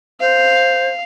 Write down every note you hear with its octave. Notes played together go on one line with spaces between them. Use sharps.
C5 F5